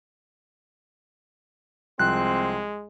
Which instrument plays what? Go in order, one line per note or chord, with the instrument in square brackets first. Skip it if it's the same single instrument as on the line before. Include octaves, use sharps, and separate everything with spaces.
[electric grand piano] C2 F3 [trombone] G#3 [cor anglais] C4 [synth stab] F#6